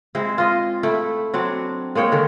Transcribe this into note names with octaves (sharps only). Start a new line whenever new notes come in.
G#3 C4 E4 C5
F4 D#5
A3 E4 G5
F#3 C4 D4
G#3 A#3 C#5 G5
D3 D#3